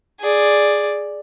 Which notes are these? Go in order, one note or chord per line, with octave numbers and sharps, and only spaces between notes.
G#4 D5